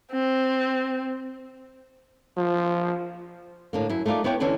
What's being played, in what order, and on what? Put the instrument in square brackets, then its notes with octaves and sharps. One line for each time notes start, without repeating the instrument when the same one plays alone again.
[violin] C4
[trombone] F3
[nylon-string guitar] A2 D3 A#3
F#2 E4
A3 A#3 D#4 F4 D5
B3 E4 B4 C#5 G5
D3 E3 C#4 D4 B4